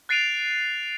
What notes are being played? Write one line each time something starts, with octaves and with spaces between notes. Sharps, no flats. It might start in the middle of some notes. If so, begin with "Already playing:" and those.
F#6 A6 C7 D7 D#7 F7